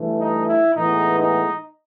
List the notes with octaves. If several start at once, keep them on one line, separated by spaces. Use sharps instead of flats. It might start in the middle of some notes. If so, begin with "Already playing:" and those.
Already playing: G2 E3 A3
D#4
E4
A2 E3 G#3 B3 D#4
D#4